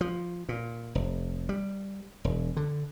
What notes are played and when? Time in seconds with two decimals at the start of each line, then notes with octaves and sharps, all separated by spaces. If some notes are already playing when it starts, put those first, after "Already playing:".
0.01 F3
0.49 A#2
0.95 F1
1.49 G3
2.24 E1
2.57 D3